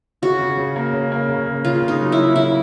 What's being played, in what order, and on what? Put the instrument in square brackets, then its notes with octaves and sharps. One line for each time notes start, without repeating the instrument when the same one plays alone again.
[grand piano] C#3 [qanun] F#4
[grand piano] C#3
C#3
A#3
C#3
A#3
C#3
C#3
[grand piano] C#3 [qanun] F4
[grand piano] C#3
[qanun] D#4
[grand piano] F#3
[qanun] E4
[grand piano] C#3
[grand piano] C#3 [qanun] E4